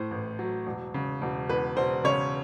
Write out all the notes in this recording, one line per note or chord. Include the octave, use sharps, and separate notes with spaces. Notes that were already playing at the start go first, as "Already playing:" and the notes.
Already playing: A2 A3 C5
A1
F#3
E1
C#3
E1
E2 B4
E1 C5
C#3 C#5